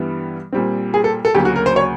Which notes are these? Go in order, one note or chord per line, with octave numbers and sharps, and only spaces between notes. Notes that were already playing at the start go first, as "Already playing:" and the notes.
Already playing: G2 E3 G3 B3
A#2 G3 C4
G#4
A4
A4
D2 C#3 F#3 A#3 G4
F#4
A#4
C5
C#5